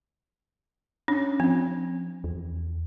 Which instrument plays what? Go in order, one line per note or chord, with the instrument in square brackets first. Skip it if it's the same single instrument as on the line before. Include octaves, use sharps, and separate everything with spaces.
[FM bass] C#4 [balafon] D4
[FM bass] F3 [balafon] C4
[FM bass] E2